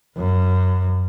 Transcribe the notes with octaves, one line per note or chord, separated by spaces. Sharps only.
F#2